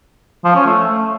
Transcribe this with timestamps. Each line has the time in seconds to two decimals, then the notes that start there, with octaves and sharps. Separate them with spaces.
0.44 F3
0.55 C#4
0.66 A3